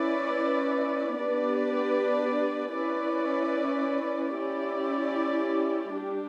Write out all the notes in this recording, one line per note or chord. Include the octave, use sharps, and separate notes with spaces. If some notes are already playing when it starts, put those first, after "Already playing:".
Already playing: C#4 E4 B4 D5
B3 D4 G4 B4 D5
C#4 E4 B4 D5
C#4 E4 G4 D5
G3 D4 G4